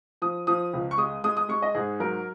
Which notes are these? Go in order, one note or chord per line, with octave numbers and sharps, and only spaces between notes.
F3 D#6
F3 D#6
C#2
C#6
G#3 D#6
G#3 D#6
D#6
G#3 C#6
D#5
G#2 G#4
F#3 A#4